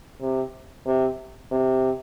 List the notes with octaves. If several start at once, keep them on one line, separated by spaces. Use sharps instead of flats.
C3
C3
C3